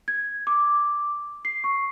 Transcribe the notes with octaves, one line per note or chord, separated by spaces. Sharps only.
G#6
D6
C7
C#6